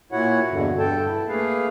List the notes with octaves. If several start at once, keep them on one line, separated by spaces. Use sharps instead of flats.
A#2 E4 F#4 C#5 F#5
E2 G2 B2 D3
G2 A4 G5 A5
E4
A3 A#3 G#4 B4 F5